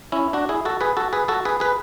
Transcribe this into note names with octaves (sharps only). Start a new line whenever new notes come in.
C#4 E4
D4 F#4
E4 G#4
F#4 A4
G#4 B4
F#4 A4
G#4 B4
F#4 A4
G#4 B4
G#4 B4